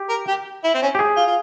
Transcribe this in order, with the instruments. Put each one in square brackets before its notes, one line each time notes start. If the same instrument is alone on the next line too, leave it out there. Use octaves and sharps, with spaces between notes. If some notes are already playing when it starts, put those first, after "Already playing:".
Already playing: [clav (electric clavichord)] G4
[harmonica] A#4
G4
E4
C4
C#4
[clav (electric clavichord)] G4
G#4
[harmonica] F4
F4